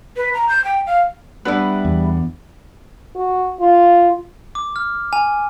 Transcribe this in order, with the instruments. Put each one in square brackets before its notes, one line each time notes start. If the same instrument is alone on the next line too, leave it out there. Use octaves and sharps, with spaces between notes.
[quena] B4
A#5
G6
G5
F5
[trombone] G3 [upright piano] B3 D4 [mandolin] E4 B4
[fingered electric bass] E2
[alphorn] F#4
F4
[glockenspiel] D6
F6
G#5